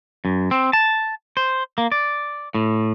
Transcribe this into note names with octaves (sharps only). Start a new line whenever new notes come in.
F#2
C4
A5
C5
A#3
D5
A2